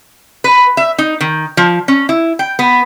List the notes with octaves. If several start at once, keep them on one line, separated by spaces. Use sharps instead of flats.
B4
E5
D#4
D#3
F3
C#4
E4
G5
B3